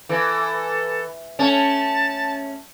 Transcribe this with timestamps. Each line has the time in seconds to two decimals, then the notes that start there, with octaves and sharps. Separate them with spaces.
0.09 E3 A4
1.39 A3 C#4 A5